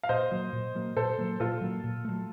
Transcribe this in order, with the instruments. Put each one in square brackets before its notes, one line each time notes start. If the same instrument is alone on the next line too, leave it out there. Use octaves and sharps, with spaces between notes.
[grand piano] F5
[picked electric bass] A#2 [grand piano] C5 D#5
[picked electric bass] F#3 A#3
A#2
F#3 A#3
[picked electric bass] A#2 [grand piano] A4 C5
[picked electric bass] F#3 A#3
[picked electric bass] A#2 [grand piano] F4 A4
[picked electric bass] F#3 A#3
A#2
F#3 A3